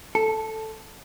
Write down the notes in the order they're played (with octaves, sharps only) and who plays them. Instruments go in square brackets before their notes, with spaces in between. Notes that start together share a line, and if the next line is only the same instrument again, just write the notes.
[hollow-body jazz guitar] A4